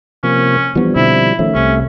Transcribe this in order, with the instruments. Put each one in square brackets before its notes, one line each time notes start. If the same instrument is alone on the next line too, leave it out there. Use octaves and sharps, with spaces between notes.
[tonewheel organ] C3 F3 A#3 [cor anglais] C#4
[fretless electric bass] E3 B3 D4 [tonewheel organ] F3 G3
[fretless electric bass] B2 D3 C4 [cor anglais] E4
[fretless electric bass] D#3 F3 C#4 [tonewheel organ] A3 E5
[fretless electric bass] C2 C3 [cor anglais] C#4